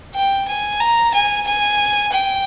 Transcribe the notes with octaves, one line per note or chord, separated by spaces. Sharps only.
G5
G#5
A#5
G#5
G#5
G5